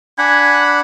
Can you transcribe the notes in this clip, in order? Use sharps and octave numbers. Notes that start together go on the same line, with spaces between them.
D4 F#5 G#5 B5